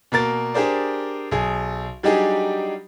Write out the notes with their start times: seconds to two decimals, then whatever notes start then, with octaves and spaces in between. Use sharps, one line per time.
0.12 B2 A#3 A#4 A6
0.54 D4 G4 G#4 A#4 C5 D5
1.31 B1 G#4
2.03 F#3 G3 D4 D#4 G4 G#4